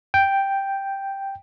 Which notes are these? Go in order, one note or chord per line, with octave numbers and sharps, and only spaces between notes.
G5